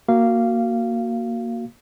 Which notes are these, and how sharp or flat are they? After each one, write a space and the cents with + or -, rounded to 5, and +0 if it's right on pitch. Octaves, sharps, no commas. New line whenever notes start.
A#3 +0 F#4 +0 F5 -15